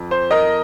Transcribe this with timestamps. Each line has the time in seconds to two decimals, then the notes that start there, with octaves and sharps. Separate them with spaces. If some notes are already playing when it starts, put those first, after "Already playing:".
Already playing: F2
0.11 C5
0.31 A#4 D#5